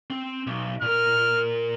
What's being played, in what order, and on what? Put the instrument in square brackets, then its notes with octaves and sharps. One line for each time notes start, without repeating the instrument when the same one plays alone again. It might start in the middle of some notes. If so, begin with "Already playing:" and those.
[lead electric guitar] C4
B1
[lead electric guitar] A#2 A#4 [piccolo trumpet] F6